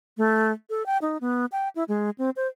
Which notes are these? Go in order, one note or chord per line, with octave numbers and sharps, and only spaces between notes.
A3
A4
G5
D#4
B3
G5
E4
G#3
C4
C5